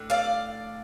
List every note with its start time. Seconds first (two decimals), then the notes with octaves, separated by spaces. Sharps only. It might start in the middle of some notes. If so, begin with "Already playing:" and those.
Already playing: A2 A3 D4
0.10 D5 F5